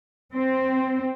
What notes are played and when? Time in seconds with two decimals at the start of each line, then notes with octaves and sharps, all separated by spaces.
0.33 C4